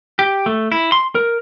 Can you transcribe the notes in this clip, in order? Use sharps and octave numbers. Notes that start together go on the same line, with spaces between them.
G4
A3
E4
C6
A#4